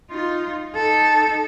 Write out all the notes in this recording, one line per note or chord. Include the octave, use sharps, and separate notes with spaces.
D#4 F4
D#4 A4